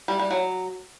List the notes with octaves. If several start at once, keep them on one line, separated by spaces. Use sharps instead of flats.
G3
G3
F#3